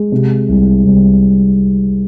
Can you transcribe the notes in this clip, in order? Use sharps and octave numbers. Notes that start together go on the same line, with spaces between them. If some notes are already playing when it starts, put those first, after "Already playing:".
Already playing: G#3
C3
C2
C2